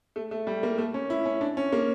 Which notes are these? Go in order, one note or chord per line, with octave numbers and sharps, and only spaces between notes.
A3
A3
G3
A#3
A3
C#4
E4
C#4
D4
C#4
A#3